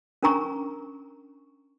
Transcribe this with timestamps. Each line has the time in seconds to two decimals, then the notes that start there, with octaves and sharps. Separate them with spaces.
0.23 C#4 D4 A#4 G#5 A#5 C#6